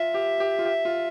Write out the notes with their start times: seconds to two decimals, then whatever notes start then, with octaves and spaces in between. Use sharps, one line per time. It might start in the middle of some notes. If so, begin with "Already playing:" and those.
Already playing: F4 E5
0.14 G4
0.40 G4
0.59 F4
0.65 G4
0.85 F4